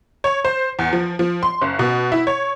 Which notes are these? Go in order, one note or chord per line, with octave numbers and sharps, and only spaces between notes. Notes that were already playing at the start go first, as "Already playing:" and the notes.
C#5
C5
E2
F3
F3
C6
F#1
B2
E4
C#5